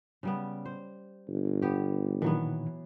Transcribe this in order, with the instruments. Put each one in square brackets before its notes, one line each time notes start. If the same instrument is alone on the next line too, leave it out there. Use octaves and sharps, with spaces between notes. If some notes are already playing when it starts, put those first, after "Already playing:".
[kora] C#3 G3 B3
C5
[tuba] G1
[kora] B3 G4
[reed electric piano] A#2 D#3 [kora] E3 F#3 B3